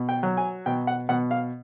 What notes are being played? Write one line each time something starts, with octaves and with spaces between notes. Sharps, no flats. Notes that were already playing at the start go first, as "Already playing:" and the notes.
Already playing: B2
G5
F#3
G#5
B2 G5
F#5
B2 F#5
F5